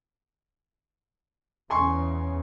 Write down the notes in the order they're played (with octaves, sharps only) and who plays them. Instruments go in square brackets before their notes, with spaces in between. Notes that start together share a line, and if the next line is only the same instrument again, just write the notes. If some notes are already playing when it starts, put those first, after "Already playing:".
[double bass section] E2 C#3 [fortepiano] G#5 C6 C#6